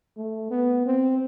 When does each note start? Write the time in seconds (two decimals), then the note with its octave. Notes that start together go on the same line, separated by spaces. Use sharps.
0.17 A3
0.51 B3
0.86 C4